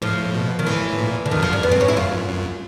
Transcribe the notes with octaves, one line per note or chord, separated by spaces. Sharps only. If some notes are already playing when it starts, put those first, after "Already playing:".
A2 F3
A2
B2
D#3
A2 E3
A2
A2
A#2
D3
F2 D#3
F#2 F3
G2
F#2 G3
F#2 B3
C4
G#2 C#4
E4
F#2 F4
F#2
F#2